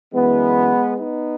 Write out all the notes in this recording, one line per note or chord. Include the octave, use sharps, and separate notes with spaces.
F#2 E3 G#3 B3
B3 D#4